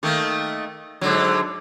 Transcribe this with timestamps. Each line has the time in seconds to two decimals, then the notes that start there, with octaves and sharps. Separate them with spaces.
0.03 D#3 A3 A#3
1.01 G#2 D3 F#3